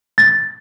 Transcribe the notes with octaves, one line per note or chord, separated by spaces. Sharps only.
A6